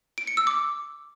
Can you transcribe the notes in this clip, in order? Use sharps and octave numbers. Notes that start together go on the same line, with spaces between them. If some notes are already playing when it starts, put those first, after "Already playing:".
D7
C#7
E6
D6